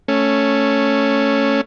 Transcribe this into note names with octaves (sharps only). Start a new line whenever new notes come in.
A3 C#4